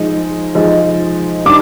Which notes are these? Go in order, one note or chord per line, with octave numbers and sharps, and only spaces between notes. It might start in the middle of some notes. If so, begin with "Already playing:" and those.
Already playing: F3 G#3 D#4
F3 G#3 D#4
D#3 G3 D4 D6